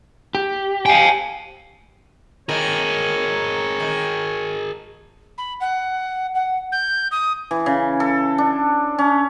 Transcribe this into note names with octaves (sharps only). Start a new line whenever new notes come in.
G4
F5 G5 G#5
D#3 A#3 G#4 A#4 C#5
D#3
B5
F#5
F#5
G6
D#6
E3
C#3
A4
D4
C#4